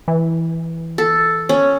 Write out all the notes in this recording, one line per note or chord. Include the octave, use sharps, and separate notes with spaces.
E3
A4
C#4